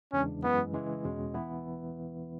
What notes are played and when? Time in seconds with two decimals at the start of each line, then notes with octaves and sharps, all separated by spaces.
0.13 E2 C#3 E3 G#3 C#4 D4
0.43 F#2 E3 G#3 B3
0.73 C#3 E3 G#3
1.04 E2 B2 G#3 C#4
1.34 E3 B3 E4